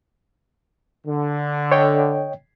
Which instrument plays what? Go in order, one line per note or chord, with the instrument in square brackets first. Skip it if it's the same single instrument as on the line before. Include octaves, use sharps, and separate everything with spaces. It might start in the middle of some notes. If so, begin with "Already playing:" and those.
[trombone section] D3
[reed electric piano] C#5 D#5 G5